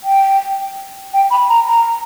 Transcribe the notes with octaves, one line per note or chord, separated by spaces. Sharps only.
G5
G5
B5
A#5
A#5